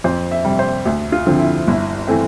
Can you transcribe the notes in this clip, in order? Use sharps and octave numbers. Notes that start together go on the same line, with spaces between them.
F2 C5
E5
C3 G3
C5
D2
F4
D3 F3 C4
E4
G1 E4
E3 A3 C4